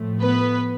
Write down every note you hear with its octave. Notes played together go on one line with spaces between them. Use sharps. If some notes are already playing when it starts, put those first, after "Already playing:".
Already playing: A2 F3 A3
B3 B4